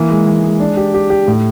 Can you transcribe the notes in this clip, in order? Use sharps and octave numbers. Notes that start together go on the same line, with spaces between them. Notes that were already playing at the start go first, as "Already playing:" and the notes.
Already playing: E3 A#3
G#3
E3
G#3
D4
G4
G4
G4
A2